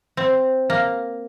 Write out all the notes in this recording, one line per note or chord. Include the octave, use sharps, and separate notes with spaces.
C4
A#3